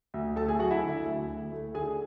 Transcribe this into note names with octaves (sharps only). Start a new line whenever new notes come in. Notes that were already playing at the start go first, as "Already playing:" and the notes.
D2
A3 A4 A5
G#4 G#5
F#3 F#4 F#5
E4 E5
D3
D2
D2
A3
D3 G#4 G#5